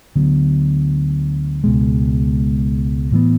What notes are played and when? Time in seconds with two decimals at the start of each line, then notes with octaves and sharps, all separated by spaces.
0.16 D2 D3 F#3 B3
1.64 C#2 B2 G#3
3.12 A2 E3 B3